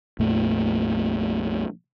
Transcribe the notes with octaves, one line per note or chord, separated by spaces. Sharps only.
A#1 F2 A#2 A3